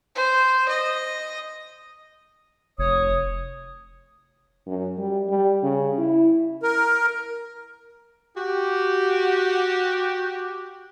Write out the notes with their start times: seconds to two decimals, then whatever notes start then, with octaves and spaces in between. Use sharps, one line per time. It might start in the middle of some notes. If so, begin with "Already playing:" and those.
0.15 C5
0.69 D#5
2.78 F1 C#5 D#6
4.67 F#2
4.97 G3
5.29 G3
5.63 C#3
5.98 E4
6.63 A#4
8.37 F#4 G4